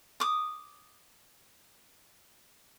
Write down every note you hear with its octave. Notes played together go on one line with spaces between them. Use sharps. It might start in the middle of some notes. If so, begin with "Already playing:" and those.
D6 D#6